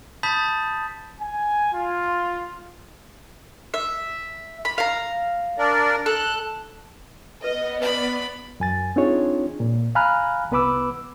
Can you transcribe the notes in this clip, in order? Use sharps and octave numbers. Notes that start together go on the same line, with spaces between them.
A5 B5 D#6 G6 A6 B6
G#5
F4
E5
B5
F5 A#5
D4 A#4 D5
A4 F#6
B3 B4 D#5
B4 D5 E5 B5
F#2 G#5 A6
C4 D4 D#4 F4 G#4 C#5
A#2
F5 G#5 A#5 B5 F6 F#6
C2 B3 B4 B5 D6 E6